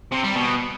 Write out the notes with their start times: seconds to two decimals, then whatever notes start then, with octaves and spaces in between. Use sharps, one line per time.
0.12 C3
0.24 G3
0.36 B2